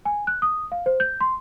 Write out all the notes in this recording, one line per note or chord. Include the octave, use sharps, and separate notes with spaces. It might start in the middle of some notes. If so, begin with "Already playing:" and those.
G#5
F#6
D#6
F5
C5
G6
C6